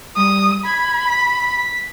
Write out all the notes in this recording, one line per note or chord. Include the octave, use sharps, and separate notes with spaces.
G3 D#6
B5 G#6
B6